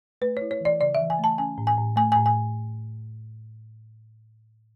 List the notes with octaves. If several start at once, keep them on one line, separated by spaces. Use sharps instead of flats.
A3 B4
E4 C#5
C#5
E3 D5
C#3 D5
E5
E3
G#5
A3 A5
C#4 G#5
A2
G#5
A2
A3 G#5
A2 G#5
G#5